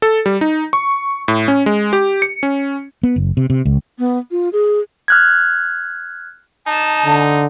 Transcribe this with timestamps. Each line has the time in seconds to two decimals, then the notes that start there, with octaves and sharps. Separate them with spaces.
0.02 A4
0.26 G3
0.41 D#4
0.73 C#6
1.28 A2
1.48 C#4
1.66 G#3
1.93 G4
2.22 C#7
2.43 C#4
3.03 B3
3.16 F#1
3.37 C3
3.50 C3
3.65 C#2
3.99 B3
4.31 F4
4.53 G#4
5.08 F6 F#6 G#6
6.67 D#4 A5
7.05 D3